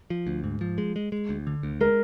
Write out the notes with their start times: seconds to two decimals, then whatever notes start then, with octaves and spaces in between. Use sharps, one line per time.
0.10 F3
0.27 D2
0.44 G#2
0.61 F3
0.78 G#3
0.96 G#3
1.12 G#3
1.29 D2
1.47 D3
1.63 D2
1.81 G#3 A#4